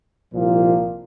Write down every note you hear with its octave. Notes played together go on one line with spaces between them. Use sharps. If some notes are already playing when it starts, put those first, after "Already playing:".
C2 A#2 F3 A#3 F4